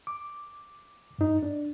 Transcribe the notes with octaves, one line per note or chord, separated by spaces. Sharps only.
D6
G2 D#4
D4